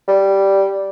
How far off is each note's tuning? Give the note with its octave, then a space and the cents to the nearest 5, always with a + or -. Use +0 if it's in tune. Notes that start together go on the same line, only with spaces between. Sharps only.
G3 -5